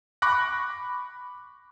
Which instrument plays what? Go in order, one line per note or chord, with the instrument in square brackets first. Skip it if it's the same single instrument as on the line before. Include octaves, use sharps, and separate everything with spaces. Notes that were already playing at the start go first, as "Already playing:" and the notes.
[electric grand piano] B5 C#6 D6 F#6 A#6